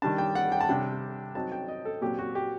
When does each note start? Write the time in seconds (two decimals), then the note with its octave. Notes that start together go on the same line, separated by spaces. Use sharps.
0.02 D#3 G3 D4 A5
0.18 G5
0.35 F#5
0.52 G5
0.61 A5
0.69 C3 G3 D4 G5
1.35 F#3 C4 D#4 A5
1.52 G5
1.68 D#5
1.85 A4
2.01 A#2 F#3 C4 G4
2.19 F#4
2.35 G4